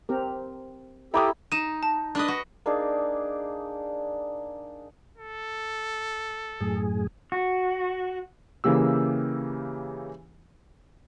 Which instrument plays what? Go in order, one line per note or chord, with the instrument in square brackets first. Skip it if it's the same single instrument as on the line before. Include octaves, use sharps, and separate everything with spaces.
[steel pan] C4 G4 A#4
[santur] E4 A#5 B5 [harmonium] G4 A4 [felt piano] G5 D6 D#6
[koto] D#4 [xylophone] D#7 E7
[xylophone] A5
[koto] D4 B4 D#5
F#4
[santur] A#3 D4 D#4 G#4
[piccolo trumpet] A4
[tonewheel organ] F#2 A2 G#4
[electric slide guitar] F#4
[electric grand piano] C#3 E3 A#3 G4 E6